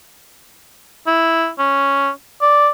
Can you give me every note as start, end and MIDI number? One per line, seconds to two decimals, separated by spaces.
1.07 1.50 64
1.58 2.10 61
2.41 2.69 74